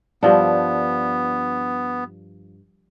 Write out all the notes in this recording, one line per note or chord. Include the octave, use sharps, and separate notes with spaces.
G2 F3 B3 D4